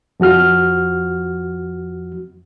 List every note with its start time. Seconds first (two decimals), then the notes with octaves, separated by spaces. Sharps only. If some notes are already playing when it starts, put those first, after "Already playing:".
0.20 F2 F3 F#4 F6